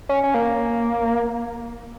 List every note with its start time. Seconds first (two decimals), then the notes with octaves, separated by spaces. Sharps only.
0.09 C#4
0.23 C#4
0.34 A#3